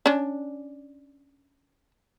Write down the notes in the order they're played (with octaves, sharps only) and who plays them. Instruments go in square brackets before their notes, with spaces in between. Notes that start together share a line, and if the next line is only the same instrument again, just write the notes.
[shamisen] C#4 D4